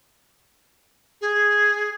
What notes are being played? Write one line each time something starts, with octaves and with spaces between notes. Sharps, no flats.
G#4